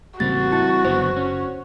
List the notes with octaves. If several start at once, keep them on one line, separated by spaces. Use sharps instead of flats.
A1 C#3 G3 A#3 C4 F#4 A6
E4 A5 A6
F#1 D3 F#3 B3 C5
C#4